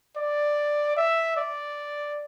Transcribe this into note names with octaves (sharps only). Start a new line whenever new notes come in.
D5
E5
D5